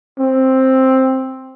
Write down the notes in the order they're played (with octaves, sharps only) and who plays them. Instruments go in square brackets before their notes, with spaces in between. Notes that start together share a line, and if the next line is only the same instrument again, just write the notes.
[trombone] C4